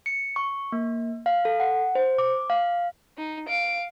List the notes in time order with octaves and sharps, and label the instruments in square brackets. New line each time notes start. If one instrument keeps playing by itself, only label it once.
[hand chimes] C#7
C#6
A#3
F5
A4
F#5
C5
D6
F5
[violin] D#4
F5 D7